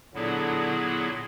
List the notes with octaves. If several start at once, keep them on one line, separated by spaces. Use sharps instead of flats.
A#2 D3 F#3 B3 E4 G#4